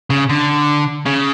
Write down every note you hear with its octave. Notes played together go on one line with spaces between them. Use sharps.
C#3
D3
C#3